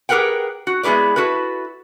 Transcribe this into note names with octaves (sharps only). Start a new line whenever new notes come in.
G4 G#4 A#4 B4 F#5 G5
F#4
G#3 B3 E4 G#4 B4 D5
E4 F#4 A4 B4